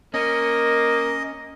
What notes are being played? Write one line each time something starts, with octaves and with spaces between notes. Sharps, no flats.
A#3 C#4 D#5